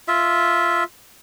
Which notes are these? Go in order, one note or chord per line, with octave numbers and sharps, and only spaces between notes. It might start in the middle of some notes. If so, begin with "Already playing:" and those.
F4 E5